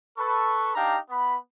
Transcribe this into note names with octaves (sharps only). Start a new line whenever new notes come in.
A4 B4 C#6
D4 D#4 G4 F5 G5 A#5
B3 B5